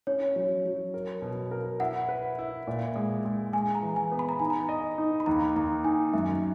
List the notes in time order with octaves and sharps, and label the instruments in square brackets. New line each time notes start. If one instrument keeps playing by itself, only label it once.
[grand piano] C#4 [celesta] C#5
[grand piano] F#3
F#3
A#4
B2
A#4
[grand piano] E4 [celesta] F#5
[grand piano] B4
E4
A#2
G#3
G#3
[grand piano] G#3 [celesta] G#5
[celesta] A#5
[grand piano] E3
[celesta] G#5
[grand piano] B3
[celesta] B5
A#5
[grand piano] D#4 [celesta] G#5
[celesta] A#5
[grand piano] D#5
D#4
[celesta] B5
[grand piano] D#2 [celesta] A#5
[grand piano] D#2 [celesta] A#5
[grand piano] D#4 [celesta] G#5
[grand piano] F#2 [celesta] E5